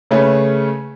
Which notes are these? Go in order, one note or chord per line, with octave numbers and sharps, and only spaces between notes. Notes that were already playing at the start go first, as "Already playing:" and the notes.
C#3 A3 C#4 G#4 B4